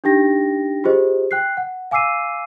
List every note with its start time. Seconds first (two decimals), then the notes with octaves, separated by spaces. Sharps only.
0.04 D4 D#4 G4 G5 A#6
0.84 F4 G4 G#4 C5 D#5
1.31 G5 F#6 C7
1.57 F#5
1.91 F5 G#5 D6 E6 C7 D#7